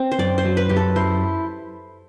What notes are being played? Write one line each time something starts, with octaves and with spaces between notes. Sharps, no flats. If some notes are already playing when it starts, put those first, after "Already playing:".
Already playing: C4
C5
F#2 D5
C5
F#3
B4
F#2 G4
A4
E4 C5